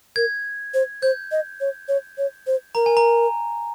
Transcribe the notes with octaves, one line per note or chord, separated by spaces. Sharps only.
A#4 G#6
C5
C5 G6
D#5
C#5
C#5
C#5
C5
A#4 A#5
G#5
A#5